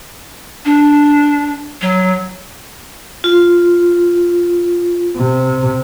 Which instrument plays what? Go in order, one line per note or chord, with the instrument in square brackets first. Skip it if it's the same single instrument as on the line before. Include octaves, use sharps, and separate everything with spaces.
[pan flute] D4
F#3
[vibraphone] F4
[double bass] C3